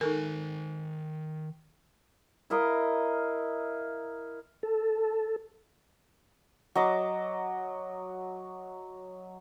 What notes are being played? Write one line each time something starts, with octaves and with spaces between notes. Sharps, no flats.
D#3 D#4 A4 A#4 G#5
E4 A#4 D#5 F5
A4
F#3 D#5 D6